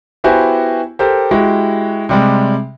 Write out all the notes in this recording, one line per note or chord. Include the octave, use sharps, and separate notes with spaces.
B3 E4 F#4 G4 C5 G#5
G4 A4 A#4 C5
G#3 E4 F#4 G4
C3 G3 G#3